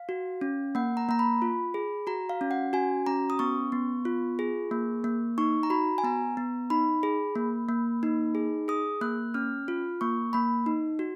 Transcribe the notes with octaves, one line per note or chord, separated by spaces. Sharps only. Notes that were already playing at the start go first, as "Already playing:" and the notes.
Already playing: F5
F#4
C#4
A#3 F#5
A#5
A#3 A#5
B5
F4
G#4
F#4 A#5
F5
C#4
F#5
F#4 G#5
C#4 A#5
D#6
B3 C#6
B3
F4
G#4
A#3
A#3
D#4 C#6
A#5
F#4 B5
G#5
B3 A#5
B3
D#4 B5
G#4
A#3
A#3
D#4
G#4
G#4 D#6
A#3 F#6
C#4 F6
F4
A#3 C#6
A#3 B5
D#4
F#4